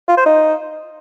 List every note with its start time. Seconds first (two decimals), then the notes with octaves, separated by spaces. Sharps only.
0.08 F4
0.17 C5
0.26 D#4